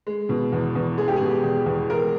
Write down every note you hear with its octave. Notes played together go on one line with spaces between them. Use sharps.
G#3
B2
E2
E2
G#3 G#4
G4
B2 G#4
E2
E2
G#3 A#4